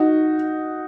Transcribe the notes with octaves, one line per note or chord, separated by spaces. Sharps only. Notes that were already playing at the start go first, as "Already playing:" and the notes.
Already playing: D#4 F#4